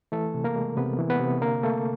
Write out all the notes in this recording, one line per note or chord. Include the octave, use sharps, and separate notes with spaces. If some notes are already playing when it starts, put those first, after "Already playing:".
E3 A3 A4
C3
A#3 A#4
G#3
C3 B3 B4
E3
B3 B4
C3
D3 A#3 A#4
A3 A#3 A4